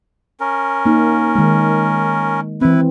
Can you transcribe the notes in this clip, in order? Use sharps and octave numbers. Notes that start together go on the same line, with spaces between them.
C#4 A#4
A#3 D#4
D#3 G#3
E3 C4 E4 B4